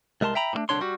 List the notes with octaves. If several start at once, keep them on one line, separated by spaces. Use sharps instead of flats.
C2 G#3 A#4 A5 C6
E5 G5 A#5 B5
A2 A3 D4
C2 D3 D4 C#5 C6
G3 F#4